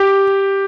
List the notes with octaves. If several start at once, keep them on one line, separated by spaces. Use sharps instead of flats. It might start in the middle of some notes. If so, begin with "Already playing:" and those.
Already playing: G4